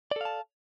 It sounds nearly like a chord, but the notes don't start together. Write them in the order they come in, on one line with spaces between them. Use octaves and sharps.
D5 A4 F5 A5